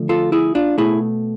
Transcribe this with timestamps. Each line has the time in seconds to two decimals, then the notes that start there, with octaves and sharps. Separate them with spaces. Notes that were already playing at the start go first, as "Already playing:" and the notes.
Already playing: D3 F3 A3
0.09 F4 A4
0.32 E4 G#4
0.55 D4 F4
0.78 B2 A3 E4 G#4